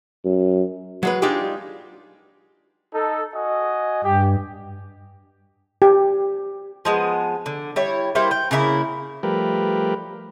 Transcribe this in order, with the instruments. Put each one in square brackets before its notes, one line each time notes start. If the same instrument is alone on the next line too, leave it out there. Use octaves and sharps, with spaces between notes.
[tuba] F#2
[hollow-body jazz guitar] F#3 G#3 B4
G#3 D4 D#4 F4 G4 G#4
[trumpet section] D#4 A4
F#4 D#5 G#5
[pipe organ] G2 [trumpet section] G4
[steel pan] G4
[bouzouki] F3 G#3 B3
D3
G3 E4 C#5
G3 A#3 E4 C5
G5
C#3 A#3 E4 A#4
[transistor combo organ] F3 G3 A3 G4 A#4 B4